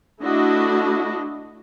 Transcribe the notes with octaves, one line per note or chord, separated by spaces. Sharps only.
A3 D4 E4 F#4 D#5